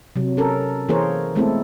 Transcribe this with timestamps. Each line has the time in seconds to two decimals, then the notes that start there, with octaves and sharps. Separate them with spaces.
0.16 C3 F#3
0.37 C#4 A4 A#4
0.89 E3 A#3 G#4 A#4 C5 C#5
1.35 G#3 A3 B3 C4 E4 A4